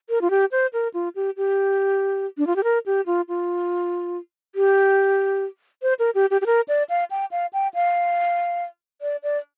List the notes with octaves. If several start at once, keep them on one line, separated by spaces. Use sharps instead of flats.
A#4
F4
G4
C5
A#4
F4
G4
G4
D4
F4
G4
A#4
G4
F4
F4
G4
C5
A#4
G4
G4
G4
A#4
D5
F5
G5
F5
G5
F5
D5
D5